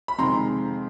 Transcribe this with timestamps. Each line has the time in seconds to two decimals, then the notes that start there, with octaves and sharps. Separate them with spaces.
0.08 B5
0.18 F2 C3 D#3 G#3 C4 A#5 C6